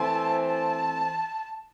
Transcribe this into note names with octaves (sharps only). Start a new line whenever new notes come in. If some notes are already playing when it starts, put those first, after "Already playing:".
Already playing: E3 A3 C4 E4 C5 A5
A5